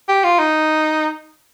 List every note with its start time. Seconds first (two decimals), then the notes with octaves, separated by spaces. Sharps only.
0.09 G4
0.24 F4
0.39 D#4